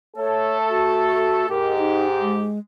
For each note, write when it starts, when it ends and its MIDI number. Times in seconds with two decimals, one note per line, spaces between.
0.17 1.45 57
0.17 1.45 69
0.17 0.57 73
0.69 1.49 66
1.50 2.47 44
1.50 2.47 67
1.50 1.73 70
1.79 2.07 63
2.21 2.59 56